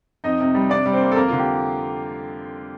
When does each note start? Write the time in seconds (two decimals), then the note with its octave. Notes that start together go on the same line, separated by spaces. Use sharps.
0.24 F2 D#4 D#5
0.40 C3
0.55 G3
0.70 C3 D4 D5
0.86 G3
0.93 C4 C5
1.01 A#3
1.12 A4
1.16 F2 A#3 A#4
1.28 D3 F4
1.39 G4